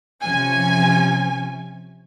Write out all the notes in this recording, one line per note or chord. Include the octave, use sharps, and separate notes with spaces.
C3 F3 C#4 G#5